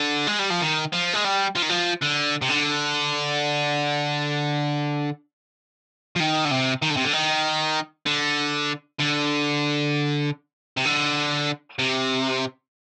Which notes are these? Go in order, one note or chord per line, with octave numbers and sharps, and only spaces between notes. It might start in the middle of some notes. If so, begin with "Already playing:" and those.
Already playing: D3
G#3
G3
F3
D#3
F3
G#3
G3
F3
D#3
F3
D3
C3
D3
F3
D#3
D3
C3
D#3
D3
C3
D3
D#3
D3
D3
C3
D3
C3